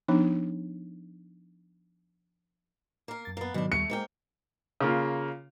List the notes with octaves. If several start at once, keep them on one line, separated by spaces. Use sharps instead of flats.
F3 B3 D4 D#4
A#3 A#4
F#2 A6
A#3 B3
G#2 B2 D#3 F#3 D4
D#2 G3 A3 C#6 C#7
G#2 G#3 A#3 G5
C#3 A#3 F4